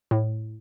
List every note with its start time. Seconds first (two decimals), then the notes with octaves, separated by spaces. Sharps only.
0.11 A2